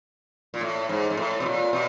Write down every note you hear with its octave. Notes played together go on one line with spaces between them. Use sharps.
A#2
A2
G#2
G#2
A2
B2
A#2
B2